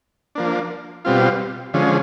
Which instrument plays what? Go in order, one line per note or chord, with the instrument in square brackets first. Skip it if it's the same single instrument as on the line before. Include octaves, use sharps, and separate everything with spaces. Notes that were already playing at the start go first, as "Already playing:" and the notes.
[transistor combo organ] F3 A#3 D4
B2 G3 C4 F4
D3 F3 G#3 C#4